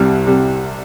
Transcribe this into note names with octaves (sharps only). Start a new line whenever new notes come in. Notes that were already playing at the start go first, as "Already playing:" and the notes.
Already playing: C2 C3 G3
C3 G3